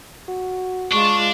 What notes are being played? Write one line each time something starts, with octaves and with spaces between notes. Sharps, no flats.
F#4
G#3 D4 F4 C#6